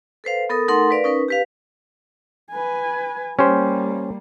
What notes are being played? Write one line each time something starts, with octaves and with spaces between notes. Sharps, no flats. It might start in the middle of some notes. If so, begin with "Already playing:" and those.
A4 B4 C5 F5
B3 A4 A#4 D#6
A3 D#4 A4 A#4 F#5 C6
A#4 B4 D5 F5
C#4 D#4 A#4 B4
G4 B4 F5
B4 G#5
G3 A#3 C#4 G4 C5